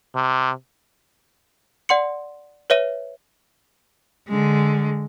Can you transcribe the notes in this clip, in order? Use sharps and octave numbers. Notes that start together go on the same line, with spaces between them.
C3
D5 F#5 C6 C#7
B4 C#5 E5 D#7
D3 G#3